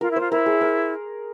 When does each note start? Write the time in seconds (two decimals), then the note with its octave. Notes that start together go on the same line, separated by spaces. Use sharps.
0.01 F4 A#4
0.11 E4
0.16 F4 C5
0.32 E4 A#4
0.46 G#4
0.61 A#4